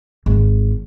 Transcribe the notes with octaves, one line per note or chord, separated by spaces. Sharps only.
G#1